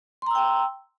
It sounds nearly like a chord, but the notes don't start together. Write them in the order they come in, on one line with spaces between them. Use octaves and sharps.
C6 A#5 E6 G5